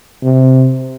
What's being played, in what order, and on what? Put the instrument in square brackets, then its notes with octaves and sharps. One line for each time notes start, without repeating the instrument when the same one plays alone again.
[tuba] C3